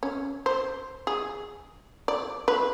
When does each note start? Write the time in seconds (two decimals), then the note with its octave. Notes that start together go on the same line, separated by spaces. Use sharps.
0.03 C#4
0.46 C5
1.07 G#4
2.08 D5
2.48 B4